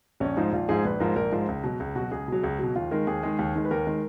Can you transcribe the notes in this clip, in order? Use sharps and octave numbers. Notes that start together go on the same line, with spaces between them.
A#1 C#4
G#2 F3 G#3 D#4
A#1 F4
G#2 F3 G#3 G#4
A#1 B4
G#2 F3 G#3 A#4
A#1 A#4
G#2 F3 G#3
C#2
B2 F#3
C#2
B2 F#3 F#4
C#2 G#4
B2 F#3
C#2
B2 F#3
D#2 F4
D#3 G#3 A#4
D#2 G#4
D#3 G#3
D#2
D#3 G#3
B4
D#2 A#4
D#3 G#3